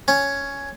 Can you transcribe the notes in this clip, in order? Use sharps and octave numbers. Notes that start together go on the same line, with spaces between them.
C#4